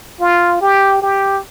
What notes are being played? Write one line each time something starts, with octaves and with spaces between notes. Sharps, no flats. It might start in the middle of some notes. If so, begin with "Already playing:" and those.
F4
G4
G4